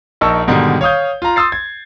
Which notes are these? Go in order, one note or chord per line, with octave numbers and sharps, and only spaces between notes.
A#1 D#4 A#4 A5 C#6 E6
G#2 B2 D3 D#3 G3
C#5 F5 D#6 G6
F4 A#5
C6 D#6 E6 A6 C7
G#6